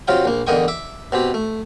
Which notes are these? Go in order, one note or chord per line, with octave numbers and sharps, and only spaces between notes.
C3 F#3 F4 F5 G5
A#1 A#3
E2 D3 A#3 D#5 G5 C#6
E5 D6
B2 C4 G4
A3